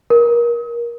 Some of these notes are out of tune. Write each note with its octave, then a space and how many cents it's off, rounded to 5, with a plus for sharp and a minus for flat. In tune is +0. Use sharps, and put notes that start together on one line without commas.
A#4 +25